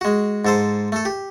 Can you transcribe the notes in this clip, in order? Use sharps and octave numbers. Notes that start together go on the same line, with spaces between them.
G#3 F#4
G#2 A4 C5
A3 A4
G4